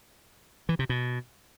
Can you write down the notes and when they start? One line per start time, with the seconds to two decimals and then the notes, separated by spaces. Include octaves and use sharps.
0.69 E3
0.79 C3
0.89 B2